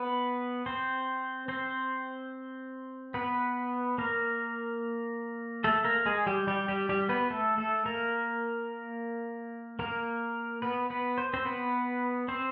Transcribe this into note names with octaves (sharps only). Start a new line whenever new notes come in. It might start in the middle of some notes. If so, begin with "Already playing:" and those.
Already playing: B3 B4
C4 C5
C4 C5
B3 B4
A#3 A#4
A3 A4
A#3 A#4
G#3 G#4
G3 G4
G3 G4
G3 G4
G3 G4
B3 B4
A3 A4
A3 A4
A#3 A#4
A#3 A#4
B3 B4
B3 B4
C5
C4 C5
B3 B4
C4 C5